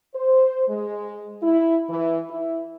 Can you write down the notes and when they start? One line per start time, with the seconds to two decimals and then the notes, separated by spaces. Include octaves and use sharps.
0.15 C5
0.68 G#3
1.43 E4
1.89 E3
2.30 E4